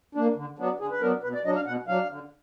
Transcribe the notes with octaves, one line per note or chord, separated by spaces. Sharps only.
A#3 D4
D3
F#3 B3 D4
D3 G#4
B4
F#3 B3 D4 A#4
B2 B4
D5
F#3 D4 D#5
F5
B2 F#5
F#3 D4 F5
D3